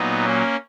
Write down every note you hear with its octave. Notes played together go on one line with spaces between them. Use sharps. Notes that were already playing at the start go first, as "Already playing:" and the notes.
Already playing: A#2 F#3 B3 D#4
A#3 C#4